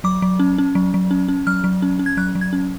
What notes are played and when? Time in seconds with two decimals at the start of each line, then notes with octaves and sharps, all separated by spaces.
0.04 F#3 D6
0.22 F#3
0.39 C#4
0.58 C#4
0.75 F#3
0.94 F#3
1.11 C#4
1.28 C#4
1.47 F#3 F6
1.64 F#3
1.82 C#4
1.99 C#4
2.06 G#6
2.17 F#3 F#6
2.35 F#3
2.41 G#6
2.53 C#4